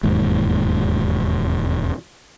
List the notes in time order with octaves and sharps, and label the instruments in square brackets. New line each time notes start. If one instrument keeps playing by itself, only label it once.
[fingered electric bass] E1 D#2 G#2